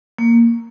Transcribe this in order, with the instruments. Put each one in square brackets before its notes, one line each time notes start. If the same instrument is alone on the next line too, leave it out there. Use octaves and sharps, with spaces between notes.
[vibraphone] A#3